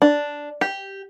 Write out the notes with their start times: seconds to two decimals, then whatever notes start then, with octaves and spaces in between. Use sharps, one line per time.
0.02 D4
0.61 G4